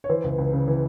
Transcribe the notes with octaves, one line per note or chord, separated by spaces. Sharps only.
C#5
E3 C5
C#2
C#2
C#3
E3